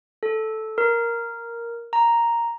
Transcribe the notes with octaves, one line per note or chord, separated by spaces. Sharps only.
A4
A#4
A#5